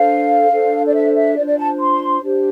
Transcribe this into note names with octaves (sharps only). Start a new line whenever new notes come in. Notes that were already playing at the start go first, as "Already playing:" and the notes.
Already playing: D4 A4 C5 F5
D4 A4 C5
D5
E5
E5
D4 F4 C5 D5
D5
A5
C6
D4 G4 C5